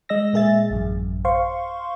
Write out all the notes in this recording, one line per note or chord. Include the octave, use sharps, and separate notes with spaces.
G#3 D#5 E6 A#6
A#2 G#3 G#4 E5 A6
A1 F#2
C5 F5 C6 C#6